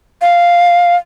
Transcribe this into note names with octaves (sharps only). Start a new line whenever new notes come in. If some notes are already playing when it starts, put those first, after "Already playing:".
F5